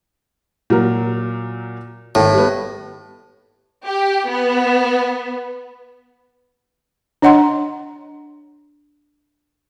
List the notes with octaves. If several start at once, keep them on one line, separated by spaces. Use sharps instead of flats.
A#2 F#3 A#4
G#1 A2
G3 B3
G4
B3
D4 C#5 D#5 F#5 A#5 C6